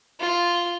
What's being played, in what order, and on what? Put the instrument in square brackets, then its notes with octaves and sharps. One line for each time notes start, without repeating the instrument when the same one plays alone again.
[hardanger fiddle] F4